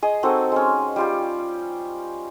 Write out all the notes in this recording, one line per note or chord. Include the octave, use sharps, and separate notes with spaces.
G#4 D#5
C4 D#4 F#4 A4
G#3 C#4
G3 F4 G4